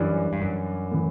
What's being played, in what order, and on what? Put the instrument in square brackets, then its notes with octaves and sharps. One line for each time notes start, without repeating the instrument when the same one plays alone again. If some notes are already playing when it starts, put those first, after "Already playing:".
Already playing: [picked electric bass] F#2 [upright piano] E3 G3 D4
[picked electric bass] G2
F#2
[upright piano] A2 E3